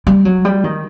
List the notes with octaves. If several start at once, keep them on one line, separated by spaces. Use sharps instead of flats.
G3
F#3
G3
D#3